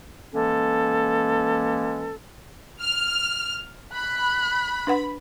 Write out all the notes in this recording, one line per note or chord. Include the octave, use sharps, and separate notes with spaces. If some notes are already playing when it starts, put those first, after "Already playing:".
E3 G#3 A#3 C#4 A4
F6
B5 F#6
D4 B4 F#5